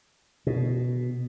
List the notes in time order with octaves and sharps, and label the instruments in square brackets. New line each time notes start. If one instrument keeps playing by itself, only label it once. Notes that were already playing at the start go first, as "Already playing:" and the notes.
[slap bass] B2